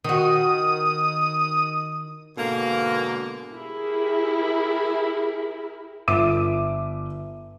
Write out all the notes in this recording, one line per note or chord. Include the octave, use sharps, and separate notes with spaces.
D#3 F#4 D#6
G#2 B2 D3 A#3
E4 G4 G#4 A#4
G1 E5 D6 D#7